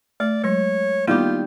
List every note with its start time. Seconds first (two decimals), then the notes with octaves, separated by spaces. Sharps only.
0.20 A3 D5
0.44 F#3 G#3 C#5
1.07 D#3 G3 A#3 B3 E4 F4 G4